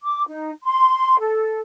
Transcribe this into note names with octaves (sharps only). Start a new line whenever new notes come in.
D6
D#4
C6
A4